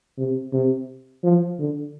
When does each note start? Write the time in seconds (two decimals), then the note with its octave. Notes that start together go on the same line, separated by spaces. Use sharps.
0.18 C3
0.53 C3
1.24 F3
1.59 D3